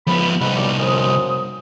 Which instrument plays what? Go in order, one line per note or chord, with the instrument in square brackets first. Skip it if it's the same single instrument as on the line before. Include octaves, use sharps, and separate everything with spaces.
[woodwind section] C#2 B5 [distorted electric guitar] F3 B3
[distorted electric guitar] C2 D#4 [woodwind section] G#2 F#5 B5
[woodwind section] G2 F#3 D5
F#2 C5 D#6